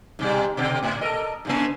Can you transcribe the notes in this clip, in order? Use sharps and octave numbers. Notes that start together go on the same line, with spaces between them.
G#2 B2 G3
B2 D3 C4
A2
A4 A#4 D#5
G#2 C#3 A#3